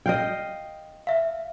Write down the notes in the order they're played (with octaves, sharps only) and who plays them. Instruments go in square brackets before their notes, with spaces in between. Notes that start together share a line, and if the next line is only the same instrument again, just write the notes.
[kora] D#5 F5 G5
[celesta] E5 F5